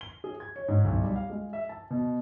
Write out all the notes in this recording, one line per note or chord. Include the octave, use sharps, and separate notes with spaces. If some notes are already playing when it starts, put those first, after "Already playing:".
G7
G#4
G#6
C#5
G#2
B1
G3
F5
G#3
E5
A5
B2